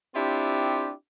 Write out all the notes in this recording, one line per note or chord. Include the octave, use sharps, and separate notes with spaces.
C4 D4 E4 F4 G4